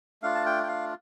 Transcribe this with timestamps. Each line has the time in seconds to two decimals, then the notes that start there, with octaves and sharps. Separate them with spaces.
0.22 A3 D4 F4 F5
0.35 A5
0.46 G5
0.63 G5
0.68 F5